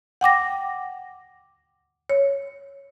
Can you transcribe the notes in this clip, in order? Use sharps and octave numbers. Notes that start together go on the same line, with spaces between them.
F#5 G5 D6 A#6
C#5